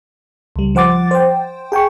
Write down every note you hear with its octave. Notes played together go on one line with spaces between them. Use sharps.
C#2 G3
F3 C5 F#5 D6 A6
C5 G5
G#4 G5 G#5 C#6